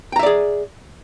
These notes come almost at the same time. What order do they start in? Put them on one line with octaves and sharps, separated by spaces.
G5 A#5 E5 D5 G#4